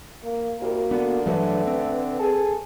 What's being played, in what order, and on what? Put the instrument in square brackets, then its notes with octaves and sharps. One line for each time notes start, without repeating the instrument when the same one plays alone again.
[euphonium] A#3
[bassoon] C2 [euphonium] A#3 [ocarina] F#4
[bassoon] D3 [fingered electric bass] B3
[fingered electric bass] G2 E3 F#3 [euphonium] A3 [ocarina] B4
[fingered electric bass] C4
[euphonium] G#4 [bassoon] A4